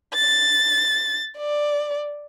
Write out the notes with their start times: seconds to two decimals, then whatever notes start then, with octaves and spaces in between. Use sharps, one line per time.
0.14 A6
1.38 D5